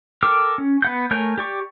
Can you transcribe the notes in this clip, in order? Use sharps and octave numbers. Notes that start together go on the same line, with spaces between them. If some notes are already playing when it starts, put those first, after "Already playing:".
A4 A#4 G5 D6 F6
C#4
B3 F#5 G6
A3 A#4 C#5 G#5 G6
G4 D5 C#6